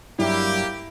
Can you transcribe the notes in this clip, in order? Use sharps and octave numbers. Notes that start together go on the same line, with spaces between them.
G2 F#3 G3 A#3 E4 G4